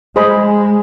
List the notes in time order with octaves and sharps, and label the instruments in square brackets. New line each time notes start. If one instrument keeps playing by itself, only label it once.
[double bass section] G#3 [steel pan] G#4 C5 D#5 B5